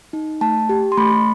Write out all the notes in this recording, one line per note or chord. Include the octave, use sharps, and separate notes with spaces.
D#4
A3 A5
G4
C6
A3 B5